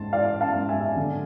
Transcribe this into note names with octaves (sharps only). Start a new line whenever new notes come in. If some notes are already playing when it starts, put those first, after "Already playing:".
Already playing: G#2 A5 C6
E3 D5 F5
F5 A5
G#2
E5 G#5
D3